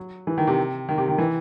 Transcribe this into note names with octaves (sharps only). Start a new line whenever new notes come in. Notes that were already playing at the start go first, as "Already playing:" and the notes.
Already playing: F#3
E3
D#3
C3
D#3
C3
D#3
E3